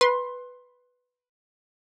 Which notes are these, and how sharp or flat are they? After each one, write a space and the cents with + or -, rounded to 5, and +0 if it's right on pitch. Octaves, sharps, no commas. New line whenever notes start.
B4 +0 C6 +20